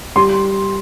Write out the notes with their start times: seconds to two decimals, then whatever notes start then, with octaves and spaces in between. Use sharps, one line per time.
0.16 G3 C6